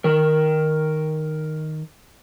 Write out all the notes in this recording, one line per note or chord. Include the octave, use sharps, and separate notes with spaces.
D#3 A#4